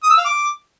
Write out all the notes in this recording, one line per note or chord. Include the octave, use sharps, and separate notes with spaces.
D#6
E6
F5
D6